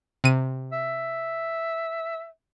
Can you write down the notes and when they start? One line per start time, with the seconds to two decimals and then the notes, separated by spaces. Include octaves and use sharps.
0.24 C3 D#7
0.72 E5